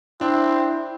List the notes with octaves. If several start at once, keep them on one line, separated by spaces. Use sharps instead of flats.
C4 D4 E4